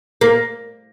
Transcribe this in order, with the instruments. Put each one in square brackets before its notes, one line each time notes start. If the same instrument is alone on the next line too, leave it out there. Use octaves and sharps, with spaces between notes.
[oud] A#3